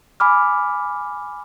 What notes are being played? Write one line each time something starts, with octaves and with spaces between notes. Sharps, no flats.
G#5 B5 D6 F6